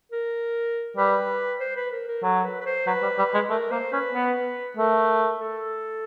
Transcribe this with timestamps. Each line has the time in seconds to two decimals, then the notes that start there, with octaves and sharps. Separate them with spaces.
0.12 A#4
0.97 G3 B4
1.60 C5
1.76 B4
1.92 A#4
2.07 A#4
2.23 F#3 A4
2.44 B4
2.61 B4
2.66 C5
2.87 F#3 B4
3.02 G3
3.18 G3
3.34 G#3
3.50 A3 A#4
3.71 A#3 C5
3.92 C#4 B4
4.13 B3
4.77 A3 A#4
5.40 A4